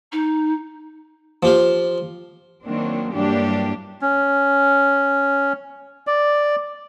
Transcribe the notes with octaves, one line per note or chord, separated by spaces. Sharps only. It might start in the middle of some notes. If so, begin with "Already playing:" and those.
D#4
F3 G4 F5
D#3 F#3 A#3 C4 D4
G2 E3 F#3 A#3 D4 G4
C#4
D5